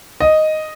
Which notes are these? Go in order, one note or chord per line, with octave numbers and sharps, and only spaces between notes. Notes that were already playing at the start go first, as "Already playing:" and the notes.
D#5